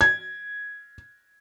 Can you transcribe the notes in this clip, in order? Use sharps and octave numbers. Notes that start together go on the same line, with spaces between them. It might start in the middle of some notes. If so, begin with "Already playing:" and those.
G#6